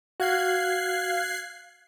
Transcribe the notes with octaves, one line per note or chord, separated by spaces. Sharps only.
F#4 F5 F#6 G#6 C7